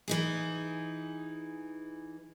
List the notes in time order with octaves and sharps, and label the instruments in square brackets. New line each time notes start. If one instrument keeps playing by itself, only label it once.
[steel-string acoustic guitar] E3 D#4 G#4